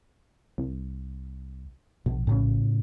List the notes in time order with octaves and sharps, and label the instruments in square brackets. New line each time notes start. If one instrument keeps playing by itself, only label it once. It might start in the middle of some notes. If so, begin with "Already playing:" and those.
[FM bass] C2
[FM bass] A#1 [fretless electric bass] B2
[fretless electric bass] A2 C#3 C#4